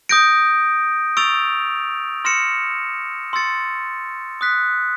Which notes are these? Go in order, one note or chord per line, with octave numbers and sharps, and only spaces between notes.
D#6 G6 A#6 D7
C#6 E6 A6 D7 F7
C6 F6 A#6 C#7 E7
C6 E6 A6 C#7
D#6 F#6 B6